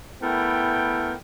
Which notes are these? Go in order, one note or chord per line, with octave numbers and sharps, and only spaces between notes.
A3 B3 E4 A#4 G5